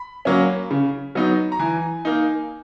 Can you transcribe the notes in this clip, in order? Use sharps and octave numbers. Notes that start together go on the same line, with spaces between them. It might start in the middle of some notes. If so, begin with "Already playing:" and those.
Already playing: B5
F#3 A#3 C#4
C#3
F#3 B3 D#4
A#5
E3 G#5
A#3 D#4